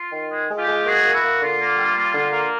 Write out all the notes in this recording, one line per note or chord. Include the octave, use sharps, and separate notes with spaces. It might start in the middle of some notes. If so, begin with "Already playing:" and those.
Already playing: F4
D#3
G#3
G#3
F4 G4
G#3
A#3 F#4 G#4
A#3
E4 F#4
A#3
D3 F4
A#3
G3
A#3
D3
A#3